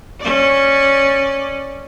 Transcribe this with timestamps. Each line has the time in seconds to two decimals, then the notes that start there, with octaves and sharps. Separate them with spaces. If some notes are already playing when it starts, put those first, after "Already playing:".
0.20 C#4 D5